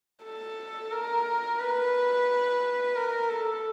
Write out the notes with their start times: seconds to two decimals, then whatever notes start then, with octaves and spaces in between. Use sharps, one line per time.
0.23 A4
0.92 A#4
1.59 B4
2.96 A#4
3.30 A4